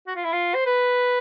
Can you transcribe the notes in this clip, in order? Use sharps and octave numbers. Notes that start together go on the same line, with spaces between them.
F#4
F4
E4
F4
C5
B4